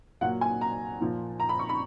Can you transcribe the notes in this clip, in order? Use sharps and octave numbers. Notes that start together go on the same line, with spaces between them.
A#2 F#3 A#3 F#5
G#5
A#5
A#2 F3 A#3
A#5
B5
C#6
B5